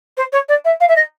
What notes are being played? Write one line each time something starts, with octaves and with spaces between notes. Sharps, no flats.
C5
C#5
D5
E5
F5
E5
D#5